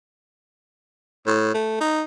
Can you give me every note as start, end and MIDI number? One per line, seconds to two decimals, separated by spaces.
1.27 1.52 45
1.54 1.76 57
1.81 2.02 63